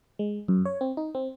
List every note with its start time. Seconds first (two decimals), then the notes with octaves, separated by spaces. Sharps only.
0.19 G#3
0.48 F#2
0.66 C#5
0.81 C4
0.97 D#4
1.15 C4